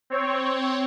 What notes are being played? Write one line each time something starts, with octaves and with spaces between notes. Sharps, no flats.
C4 C#5